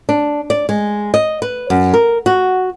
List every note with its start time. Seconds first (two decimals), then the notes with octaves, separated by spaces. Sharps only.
0.09 D4
0.50 D5
0.69 G#3
1.14 D#5
1.42 B4
1.70 F#2
1.94 A#4
2.26 F#4